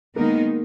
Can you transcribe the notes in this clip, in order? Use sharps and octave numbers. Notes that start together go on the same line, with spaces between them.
D#3 G#3 A#3 B3 D#4 A#4